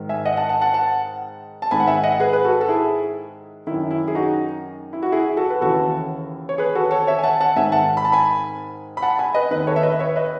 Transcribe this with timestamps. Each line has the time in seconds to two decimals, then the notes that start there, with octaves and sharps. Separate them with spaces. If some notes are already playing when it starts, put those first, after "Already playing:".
Already playing: G#2 D#3
0.09 E5 G#5
0.25 D#5 F#5
0.37 F#5 A5
0.49 F#5 A5
0.62 F#5 A5
0.74 F#5 A5
1.62 A5
1.71 G#2 D#3 G#5 B5
1.80 F#5
1.87 E5 G#5
2.03 D#5 F#5
2.20 G#4 B4
2.33 B4
2.45 F#4 A4
2.61 A4
2.69 E4 G#4
3.67 D#3 E4
3.71 F#2
3.91 E4
4.08 G#4
4.15 D#4 F#4
4.93 E4
5.03 F#4
5.12 E4 G#4
5.37 F#4 A4
5.50 B4
5.61 D#2 C#3 E3 F#4 A4
6.49 C#5
6.58 G#4 B4
6.75 F#4 A4
6.91 A4 C#5
7.07 C#5 E5
7.19 G#5
7.23 F#5 A5
7.41 F#5 A5
7.56 G#2 D#3 E5 G#5
7.72 F#5 A5
7.97 B5
8.05 A5
8.12 G#5 B5
8.97 B5
9.02 F#5 A5
9.19 G#5 B5
9.35 B4 D#5
9.51 D#3 B4 D#5
9.55 D#2
9.67 A4 C#5
9.76 E5
9.83 B4 D#5
9.99 C#5 E5
10.16 B4 D#5